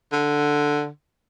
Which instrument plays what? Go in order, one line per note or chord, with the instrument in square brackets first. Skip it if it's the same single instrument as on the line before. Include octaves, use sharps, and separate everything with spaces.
[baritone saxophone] D3